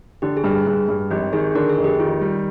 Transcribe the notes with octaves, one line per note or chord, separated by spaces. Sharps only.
D3 G4
G#4
G2
G#4
G2
G2
G#1 G4
D#3 G#4
D3 A#4
G#4
F1
G4
D#3 F4
G3